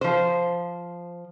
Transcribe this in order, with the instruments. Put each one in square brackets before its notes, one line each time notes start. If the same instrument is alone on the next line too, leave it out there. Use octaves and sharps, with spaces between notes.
[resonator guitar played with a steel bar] F3 C5